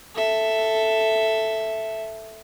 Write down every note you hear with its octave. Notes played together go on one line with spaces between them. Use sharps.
A4 E5